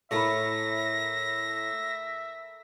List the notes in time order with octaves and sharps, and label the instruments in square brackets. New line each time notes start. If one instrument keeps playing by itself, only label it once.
[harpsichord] A2 [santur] A4 A#4 B5 [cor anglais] E5 [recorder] A#6